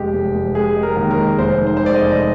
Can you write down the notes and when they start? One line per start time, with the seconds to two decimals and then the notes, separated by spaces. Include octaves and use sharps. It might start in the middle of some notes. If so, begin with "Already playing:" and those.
Already playing: F1 G#3 G4
0.13 F1
0.34 F1
0.55 G#3 G#4
0.76 G#3
0.83 A#4
0.96 D#2
1.11 A#4
1.18 G#3
1.39 F1 C5
1.60 D#3
1.67 C5
1.77 G#3 C5
1.86 D5
1.95 D#5
2.01 F1
2.12 D#5